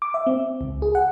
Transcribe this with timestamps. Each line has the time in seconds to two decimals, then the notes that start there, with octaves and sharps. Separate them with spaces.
0.02 D6
0.14 E5
0.27 C4
0.61 C#2
0.82 G#4
0.95 F#5